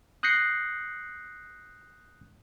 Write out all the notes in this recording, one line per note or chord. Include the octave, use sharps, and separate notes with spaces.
D#6 F#6 G6 A#6 C7 C#7